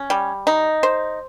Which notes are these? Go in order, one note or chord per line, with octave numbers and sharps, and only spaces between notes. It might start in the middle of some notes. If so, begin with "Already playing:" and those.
Already playing: C#4
G3
D#4
C5